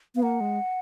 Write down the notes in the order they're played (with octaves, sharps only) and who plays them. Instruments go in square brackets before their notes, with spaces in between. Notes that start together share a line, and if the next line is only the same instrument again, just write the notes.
[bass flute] B3 [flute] F5
[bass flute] A#3 [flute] F#5
[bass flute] G#3